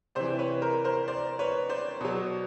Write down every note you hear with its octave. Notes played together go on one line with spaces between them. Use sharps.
C3 E3 C5 D5
C5
B4 C#5
A#4 C5
A#4 C5
C5 D5
B4 C#5
C5 D5
B2 F#3